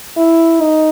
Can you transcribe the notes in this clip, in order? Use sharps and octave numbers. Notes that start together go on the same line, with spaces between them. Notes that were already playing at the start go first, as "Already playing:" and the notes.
E4
D#4